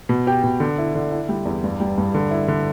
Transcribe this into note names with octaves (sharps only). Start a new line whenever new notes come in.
B2
G4
B2
D3
E4
D3
E4
G3
E2
G2
G3
G2
D3
E4
D3